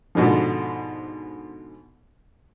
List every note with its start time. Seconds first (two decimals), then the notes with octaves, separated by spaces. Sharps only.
0.15 G#2 B2 D3 F3